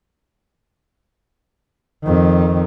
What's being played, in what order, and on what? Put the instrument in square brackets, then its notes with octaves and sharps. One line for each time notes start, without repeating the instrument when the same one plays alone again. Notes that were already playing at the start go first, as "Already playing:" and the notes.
[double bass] F2 D#3